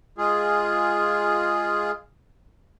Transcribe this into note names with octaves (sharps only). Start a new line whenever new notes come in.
G#3 F4 G#4